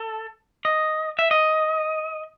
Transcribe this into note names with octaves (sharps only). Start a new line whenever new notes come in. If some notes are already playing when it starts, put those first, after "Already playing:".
Already playing: A4
D#5
E5
D#5